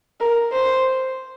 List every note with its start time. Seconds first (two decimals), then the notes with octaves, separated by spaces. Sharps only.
0.20 A#4
0.53 C5